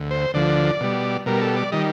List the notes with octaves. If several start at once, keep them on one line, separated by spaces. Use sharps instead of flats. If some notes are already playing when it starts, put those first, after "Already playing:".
Already playing: D2
C5
D2 D3 F3 D5
B2 G3
B2 G3 A#4
A4
D5
D#3 G3 D#5